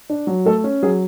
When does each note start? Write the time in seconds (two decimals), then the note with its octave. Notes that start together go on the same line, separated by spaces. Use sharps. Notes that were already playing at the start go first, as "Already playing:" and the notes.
0.10 D4
0.27 F#3
0.46 A3 A4
0.64 C#4
0.82 F#3 G#4